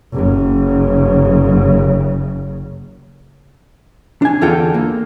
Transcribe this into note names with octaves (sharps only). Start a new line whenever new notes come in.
F#1 C#3
D4 G#5
E2 D3 F4 A4 G5
A#3